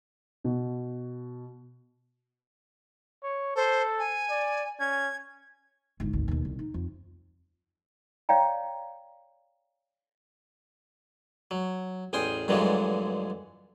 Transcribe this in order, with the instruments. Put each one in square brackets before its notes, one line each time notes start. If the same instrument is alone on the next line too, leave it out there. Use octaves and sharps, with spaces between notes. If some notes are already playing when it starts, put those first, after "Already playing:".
[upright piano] B2
[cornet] C#5
[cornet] A4 [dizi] C5
[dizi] G#5
[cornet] D5
[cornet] C#4 [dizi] G#6
[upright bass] G1 G#2
G#1 D2
D#2 B2
C2
D#4
F2
[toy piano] C#5 D5 F5 G5 A#5
[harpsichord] F#3
A1 E2 G5 G#5 C6 D#6
G2 A#2 D3 E3 F#3 G#3